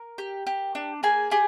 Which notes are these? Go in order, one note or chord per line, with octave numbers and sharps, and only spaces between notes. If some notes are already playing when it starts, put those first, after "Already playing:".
Already playing: A#4
G4
G4
D4
A#3 G#4 G#5
G4 G#4 G#5